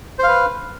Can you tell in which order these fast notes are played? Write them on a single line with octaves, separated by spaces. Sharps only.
C5 F5 B4